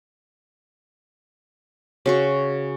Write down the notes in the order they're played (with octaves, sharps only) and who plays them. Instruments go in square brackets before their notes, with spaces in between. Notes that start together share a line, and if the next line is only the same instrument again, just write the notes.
[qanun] C#3 F#4 C#6